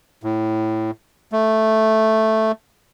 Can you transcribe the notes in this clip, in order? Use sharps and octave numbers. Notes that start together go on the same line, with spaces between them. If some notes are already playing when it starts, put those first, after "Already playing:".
A2
A3